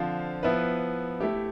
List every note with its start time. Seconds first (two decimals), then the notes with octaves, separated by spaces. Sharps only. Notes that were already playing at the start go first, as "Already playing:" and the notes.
Already playing: D3 F3 C4 F4 C5
0.43 F3 B3 E4 B4
1.20 A3 E4 G4